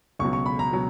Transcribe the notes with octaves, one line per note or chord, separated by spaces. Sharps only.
C#2 B2 F#3 C#6
C#6
B5
A#5
B2 F#3